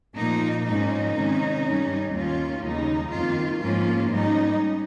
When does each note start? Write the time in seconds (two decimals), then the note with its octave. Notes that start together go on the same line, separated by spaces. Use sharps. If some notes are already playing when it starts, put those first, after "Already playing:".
0.16 A#2 F3 A#3 D#4
0.65 G#2 F3 A#3 C#4 D#4
1.14 C3 D#3 G#3 C#4
1.63 G2 G3 C#4
2.13 D#2 D#3 A#3 C#4 F4
2.62 D#2 C#3 G3 D#4
3.11 F2 D#3 A#3 F4
3.60 G#2 F3 A#3 C#4 F4
4.10 G#2 G3 C#4 D#4